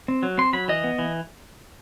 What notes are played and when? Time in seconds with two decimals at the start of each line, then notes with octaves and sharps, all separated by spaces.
0.08 C4
0.23 F#3
0.38 C4 C6
0.53 F#3 B5
0.68 E3 D#5
0.84 B3
0.99 E3